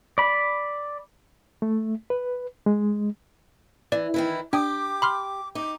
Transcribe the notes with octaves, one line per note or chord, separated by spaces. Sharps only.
D5 B5
A3
B4
G#3
E3 D5
D#3 E3 E4
D4 G4 G5 D6 D#6
B5 C6 F6
D#4 D6